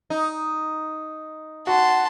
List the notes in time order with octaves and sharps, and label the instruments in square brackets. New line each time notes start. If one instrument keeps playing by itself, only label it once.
[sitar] D#4
[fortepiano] F#4 [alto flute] F#5 [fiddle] A5 C6